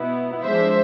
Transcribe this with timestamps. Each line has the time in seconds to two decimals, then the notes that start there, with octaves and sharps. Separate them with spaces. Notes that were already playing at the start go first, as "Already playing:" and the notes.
Already playing: B2 B3 E4
0.45 F3 G#3 D4 C5 E5